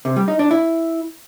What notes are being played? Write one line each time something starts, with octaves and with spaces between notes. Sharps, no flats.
C3
G3
D#4
D4
E4